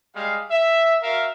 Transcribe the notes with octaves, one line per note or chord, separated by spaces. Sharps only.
G3 G#3 F5
E5
F#4 A#4 E5 F5